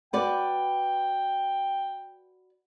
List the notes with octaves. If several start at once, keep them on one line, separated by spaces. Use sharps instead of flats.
F#4 B4 D5 G5